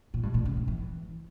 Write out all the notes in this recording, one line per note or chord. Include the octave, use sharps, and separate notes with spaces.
A#2
G2
A#2
C#3
D3
E3